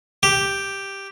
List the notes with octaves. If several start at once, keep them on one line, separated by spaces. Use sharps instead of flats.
G4